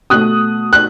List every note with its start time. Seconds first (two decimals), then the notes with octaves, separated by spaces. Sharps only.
0.10 B2 A3 D#6 F#6
0.73 F#6